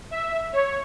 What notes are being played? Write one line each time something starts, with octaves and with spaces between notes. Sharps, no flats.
E5
C#5